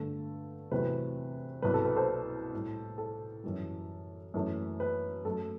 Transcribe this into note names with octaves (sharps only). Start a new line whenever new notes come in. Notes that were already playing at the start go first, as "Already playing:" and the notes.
Already playing: G2 D3 A3 A4
E2 C3 F#3 A3 B4
C2 B2 F#3 B4
A4
B4
A4 C5
A2 G3
A4
F#2 E3 G3
F#2 E3 A3
B4
F#2 F#3 A3 A4